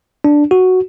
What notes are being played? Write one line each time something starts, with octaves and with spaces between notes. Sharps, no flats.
D4
F#4